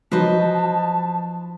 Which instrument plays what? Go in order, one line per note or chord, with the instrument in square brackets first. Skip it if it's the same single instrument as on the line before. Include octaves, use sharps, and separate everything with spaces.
[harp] F3 D#4 [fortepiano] F#3 [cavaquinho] B4 C5 D#5 [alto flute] A5